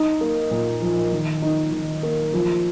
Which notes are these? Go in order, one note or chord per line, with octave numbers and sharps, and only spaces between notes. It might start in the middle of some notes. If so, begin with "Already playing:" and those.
Already playing: D#4
A#3
A#2
F3
D#3
D#4
D#3
A#3
F3